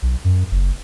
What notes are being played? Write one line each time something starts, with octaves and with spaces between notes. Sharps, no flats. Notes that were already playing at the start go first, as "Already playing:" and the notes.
B1
F#2
F#1